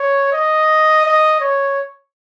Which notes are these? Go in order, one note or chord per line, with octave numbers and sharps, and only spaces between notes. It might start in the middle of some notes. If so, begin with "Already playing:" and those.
Already playing: C#5
D#5
D#5
C#5